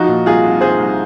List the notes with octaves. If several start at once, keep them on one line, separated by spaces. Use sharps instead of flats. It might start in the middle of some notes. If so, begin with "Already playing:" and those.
Already playing: F3 D#4 F#4
A#2
C2 F4 G#4
C2
C2 G#4 C5
C2